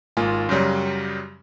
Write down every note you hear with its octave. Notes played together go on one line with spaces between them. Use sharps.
G#1 A#3 F4 G#5
F#2 C#3 F#3 G3